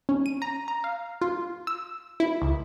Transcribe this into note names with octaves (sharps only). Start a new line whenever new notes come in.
C#4
D#7
A#5
A#5
F5
F4
E6
E4
C#2